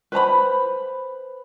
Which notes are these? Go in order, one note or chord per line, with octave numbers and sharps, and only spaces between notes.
B4 C5 A#5 B5